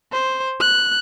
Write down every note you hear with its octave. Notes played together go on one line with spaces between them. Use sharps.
C5
F#6